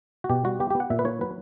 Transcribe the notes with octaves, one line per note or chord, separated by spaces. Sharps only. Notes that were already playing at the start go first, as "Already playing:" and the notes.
F#4
B2 G4
G3 F#4
B3 G4
G4
B3
F#5
A#2 E5
B4
A#3 C#5
F#3 B4